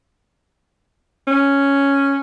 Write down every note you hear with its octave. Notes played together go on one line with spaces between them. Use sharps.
C#4